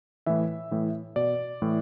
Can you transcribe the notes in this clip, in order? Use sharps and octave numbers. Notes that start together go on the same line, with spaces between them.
A2 E3 E5
A2 E3
B2 D5
A2 E3